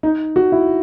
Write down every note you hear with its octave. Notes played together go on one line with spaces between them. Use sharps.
D#4
F#4
E4